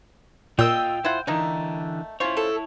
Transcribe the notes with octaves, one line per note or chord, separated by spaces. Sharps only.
A#2 F4 D#5 G5 E6
E4 F4 C5 F#5
D3 E3 A3 A#3 D#4
C#4 E4 F4 C5 C#5
A4